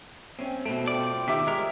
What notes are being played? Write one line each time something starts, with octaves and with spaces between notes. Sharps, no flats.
G2 C3 C4 C#4
B2 A3 D7
F4 D5 G5 C6
D#3 G4 E5 D6 B6
A2 C3 G#3 A#4